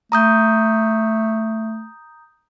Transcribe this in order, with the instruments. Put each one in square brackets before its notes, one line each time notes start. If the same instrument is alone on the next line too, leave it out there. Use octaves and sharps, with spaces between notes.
[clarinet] A3 [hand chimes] A#5 D#6 G6